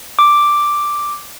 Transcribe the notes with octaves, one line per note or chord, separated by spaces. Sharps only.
D6